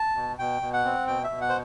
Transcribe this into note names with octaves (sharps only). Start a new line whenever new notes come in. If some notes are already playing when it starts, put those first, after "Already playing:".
Already playing: A5
B2
B2 G5
B2
F#5
C4
B2 G5
E5
B2
F#5
C5